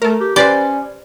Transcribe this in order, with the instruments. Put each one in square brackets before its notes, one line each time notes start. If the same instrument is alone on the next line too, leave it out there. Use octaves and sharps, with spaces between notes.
[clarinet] A3 [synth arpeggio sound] A4 A#4
[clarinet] G4
[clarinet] C#4 [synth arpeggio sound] G4 B4 C5 [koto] D5